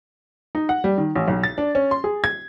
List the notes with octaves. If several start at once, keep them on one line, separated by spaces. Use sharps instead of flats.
D#4
F#5
G3
D#3
A1
B1
A6
D4
C#4
C6
G#4
G#6